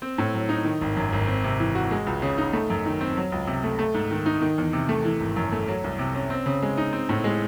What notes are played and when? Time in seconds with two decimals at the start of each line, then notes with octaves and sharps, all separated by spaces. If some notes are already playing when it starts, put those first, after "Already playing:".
0.02 C4
0.18 A2
0.34 F#3
0.49 D#4
0.65 D#3
0.81 G#1
0.97 F#2
1.13 G#1
1.27 C4
1.44 C3
1.60 E3
1.75 F#4
1.91 G#3
2.07 C#2
2.22 C#3
2.38 D#4
2.53 A3
2.70 F#2
2.86 D#3
3.01 C4
3.17 F#3
3.32 C#2
3.47 C3
3.64 A3
3.79 A3
3.94 G#2
4.11 D#3
4.26 D#4
4.42 D#3
4.58 E2
4.73 C3
4.89 A3
5.05 E3
5.20 G#1
5.36 F#2
5.52 A3
5.68 F#3
5.84 C2
5.99 C3
6.15 C#4
6.30 C4
6.46 C#3
6.62 G#3
6.77 D#4
6.93 C4
7.09 A2
7.24 G#3